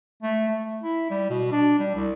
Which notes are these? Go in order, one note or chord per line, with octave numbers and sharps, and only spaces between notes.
A3
A3
E4
G3
B2
D4
G3
C2